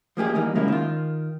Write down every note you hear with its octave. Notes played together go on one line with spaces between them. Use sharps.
F3 A#3 G4 G#4
E3 G3 A#3 D#4
G#2 C#3 F#3 A#3 C#4 E4
D#3 F4